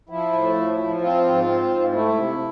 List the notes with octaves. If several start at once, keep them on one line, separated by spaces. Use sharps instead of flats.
F3 E4
A2
F3
F3
C4 F4
G#2
C4
G#2
A3 E4
C3